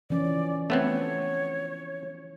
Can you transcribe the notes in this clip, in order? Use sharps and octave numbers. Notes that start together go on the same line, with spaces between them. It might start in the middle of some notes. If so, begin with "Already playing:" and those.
E3 F3 C#4 D5
A3 B3 C4 C#5